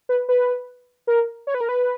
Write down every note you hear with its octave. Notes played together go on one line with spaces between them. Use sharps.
B4
B4
A#4
C#5
B4
A#4
B4